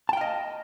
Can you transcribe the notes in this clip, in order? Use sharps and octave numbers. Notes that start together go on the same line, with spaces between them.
D#5 F5 G5 A5